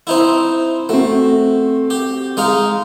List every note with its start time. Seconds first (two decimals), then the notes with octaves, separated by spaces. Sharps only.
0.07 C4 D#4 E4
0.89 A3 C4 F#4
1.90 G4
2.37 G#3 D#4 F5